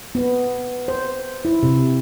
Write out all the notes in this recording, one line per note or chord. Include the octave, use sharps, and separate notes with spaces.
B3
C5
E4
C3